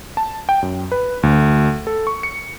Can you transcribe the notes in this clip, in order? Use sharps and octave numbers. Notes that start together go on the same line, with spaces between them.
A5
G5
F#2
B4
D2
A4
C#6
C#7